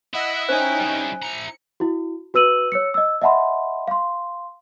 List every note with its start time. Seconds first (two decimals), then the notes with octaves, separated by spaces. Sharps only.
0.14 E4 D#5 F#5 E6
0.49 C#4 D#4 C5 G5 G#5 F#6
0.80 G3 E4
1.22 E4 A#5 C#7
1.80 E4 F#4
2.34 F#4 B4 E6 D#7 F#7
2.72 C#5 E6 C#7
2.94 D#5 E6
3.22 D#5 E5 F#5 A5 B5 C6
3.88 F5 C6